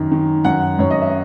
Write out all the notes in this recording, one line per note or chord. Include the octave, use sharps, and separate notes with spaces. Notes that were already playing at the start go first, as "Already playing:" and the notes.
Already playing: F#2 D#3
D#3
F#2 F#5
F#2 C#5
D#5
E5